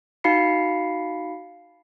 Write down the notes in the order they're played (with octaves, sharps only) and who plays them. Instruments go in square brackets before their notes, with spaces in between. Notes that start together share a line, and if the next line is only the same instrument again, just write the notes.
[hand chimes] D#4 F#4 F5 B5 C7 C#7